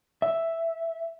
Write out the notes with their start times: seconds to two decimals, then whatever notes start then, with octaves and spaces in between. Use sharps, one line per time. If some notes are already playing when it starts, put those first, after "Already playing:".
0.22 E5